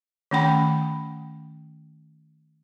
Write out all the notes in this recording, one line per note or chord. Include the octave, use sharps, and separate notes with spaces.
D#3 A3 C#4 F#5 G5 B5